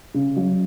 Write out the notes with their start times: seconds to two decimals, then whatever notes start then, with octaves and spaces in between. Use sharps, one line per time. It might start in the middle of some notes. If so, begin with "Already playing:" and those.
0.14 C#3
0.36 F#3